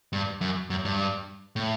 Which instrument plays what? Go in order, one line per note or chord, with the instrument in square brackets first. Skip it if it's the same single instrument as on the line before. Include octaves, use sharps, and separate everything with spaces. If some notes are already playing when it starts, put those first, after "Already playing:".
[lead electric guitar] G2
F#2
F#2
G2
A2